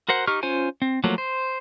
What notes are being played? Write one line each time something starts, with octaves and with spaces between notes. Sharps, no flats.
F#4 A#4 C5 F#5
D#4 G4 C#6 F6
C#4 F4 C5 G#5
C4
F3 F#3 A3 A#3
C5